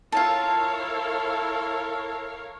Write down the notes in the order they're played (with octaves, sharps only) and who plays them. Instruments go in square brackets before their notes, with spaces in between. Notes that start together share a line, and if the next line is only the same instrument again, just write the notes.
[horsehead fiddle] E4 A4 [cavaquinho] F4 A5 [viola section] A#4 C#5 F5